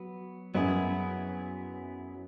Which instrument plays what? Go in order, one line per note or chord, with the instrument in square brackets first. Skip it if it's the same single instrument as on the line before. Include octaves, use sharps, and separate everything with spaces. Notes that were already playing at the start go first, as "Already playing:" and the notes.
Already playing: [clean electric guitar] F#3 B3
[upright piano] F#2 [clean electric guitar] F#3 B3 E4 G#4